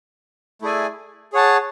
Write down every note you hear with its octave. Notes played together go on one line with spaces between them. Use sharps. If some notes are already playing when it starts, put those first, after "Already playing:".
A3 E4 G#4 D5 G#5
G#4 C#5 F#5 A5